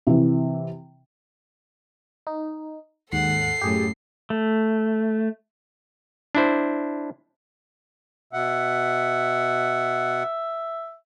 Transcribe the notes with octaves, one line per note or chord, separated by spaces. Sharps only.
C3 E3
D#4
D#2 G#2 A4 F#5 C7
F#2 A2 G4 G#4
A3
D4 E4 C5
B2 E5 F#5